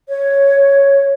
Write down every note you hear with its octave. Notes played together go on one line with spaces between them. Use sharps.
C#5